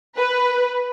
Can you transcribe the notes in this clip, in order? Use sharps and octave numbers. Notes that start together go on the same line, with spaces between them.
B4